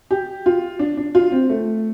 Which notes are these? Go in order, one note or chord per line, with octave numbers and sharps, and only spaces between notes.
G4
F4
D4
D4
F4
C4
A3